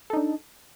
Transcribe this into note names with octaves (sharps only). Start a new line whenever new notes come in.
D4 D#4 A4